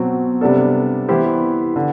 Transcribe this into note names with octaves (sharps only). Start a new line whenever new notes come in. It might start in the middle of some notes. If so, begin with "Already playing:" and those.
Already playing: B2 F#3 C4
C3 G3 B3 D4 A4
E3 B3 E4 G4 C5
D3